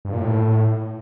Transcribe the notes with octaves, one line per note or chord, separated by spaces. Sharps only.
G2
A#2
A2